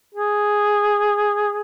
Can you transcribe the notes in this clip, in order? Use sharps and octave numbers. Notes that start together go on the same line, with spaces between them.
G#4